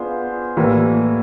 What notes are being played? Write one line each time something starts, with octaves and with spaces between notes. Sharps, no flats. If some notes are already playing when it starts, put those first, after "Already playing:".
Already playing: B3 D4 F4 G#4 C5
A2 E3 G3 A#3